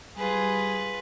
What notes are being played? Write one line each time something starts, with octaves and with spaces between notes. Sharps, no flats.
G3 F4 G#4 B4